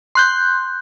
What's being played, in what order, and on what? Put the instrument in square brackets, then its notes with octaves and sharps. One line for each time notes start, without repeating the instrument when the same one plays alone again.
[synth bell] C6 F#6 G6